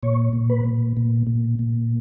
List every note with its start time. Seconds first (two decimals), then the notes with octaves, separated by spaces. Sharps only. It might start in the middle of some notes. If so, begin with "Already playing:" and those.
0.03 A#2 C#5
0.33 A#2
0.50 B4
0.65 A#2
0.97 A#2
1.27 A#2
1.59 A#2